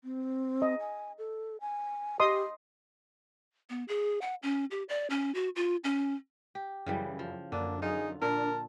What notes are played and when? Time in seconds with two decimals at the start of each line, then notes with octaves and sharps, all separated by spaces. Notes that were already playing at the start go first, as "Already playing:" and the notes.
0.04 C4
0.62 D#5
0.80 G#5
1.18 A4
1.61 G#5
2.20 G4 D#5 C6 D#6
3.70 B3
3.88 G#4
4.22 F#5
4.43 C#4
4.71 G4
4.89 D5
5.10 C#4
5.35 F#4
5.56 F4
5.84 C#4
6.55 G4
6.86 F#2 C#3 E3 G3
7.19 F3
7.52 F#2 D3 A#3 D4
7.82 D#4 F4 G#4
8.21 A#2 D4 A#4 A5